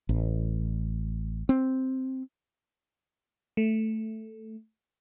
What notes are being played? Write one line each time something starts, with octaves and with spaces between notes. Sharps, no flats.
A1
C4
A3